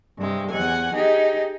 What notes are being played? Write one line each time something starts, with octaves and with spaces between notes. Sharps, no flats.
G2 C3 G#3
E2 F#5 G#5
D#4 G4 G#4